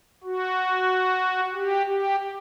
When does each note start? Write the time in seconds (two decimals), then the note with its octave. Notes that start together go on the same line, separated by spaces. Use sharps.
0.24 F#4
1.53 G4
1.87 G4